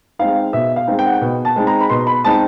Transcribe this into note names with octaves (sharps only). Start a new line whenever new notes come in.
G#3 C4 D#4 F5
B2 E5
F5
G#3 C4 D#4
G5
F#5
G5
B2
A5
G#3 C4 D#4
A#5
B5
B2 C6
B5
G#3 C4 D#4 A5